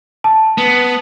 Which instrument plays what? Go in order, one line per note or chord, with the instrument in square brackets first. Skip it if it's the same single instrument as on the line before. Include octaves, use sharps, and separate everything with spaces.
[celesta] A5
[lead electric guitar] B3